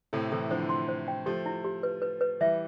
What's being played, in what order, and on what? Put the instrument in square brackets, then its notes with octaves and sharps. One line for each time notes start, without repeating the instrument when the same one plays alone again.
[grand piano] A2 C3 [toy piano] A4
[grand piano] C3 E3 [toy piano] A4
[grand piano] D3 F3 [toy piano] C5
[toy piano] C6
C5
G5
[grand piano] F3 A3 [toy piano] G4
[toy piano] E4
G4
B4
B4
B4
[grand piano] E3 G3 [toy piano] E5